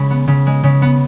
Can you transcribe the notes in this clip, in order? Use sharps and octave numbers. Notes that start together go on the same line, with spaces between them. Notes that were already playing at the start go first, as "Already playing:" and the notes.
Already playing: C#3 G#3 B5
B3
C#3
G#3
C#3
B3